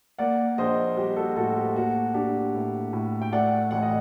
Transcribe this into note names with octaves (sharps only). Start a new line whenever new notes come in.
A#3 D5 F#5
A#1 C5 D#5
G3 G4
F#4 A4
A2 F#4 A4
G4
A#3 F#4
D4 G4
A2
A2
G5
A3 D5 F#5
A1 F#5
D#5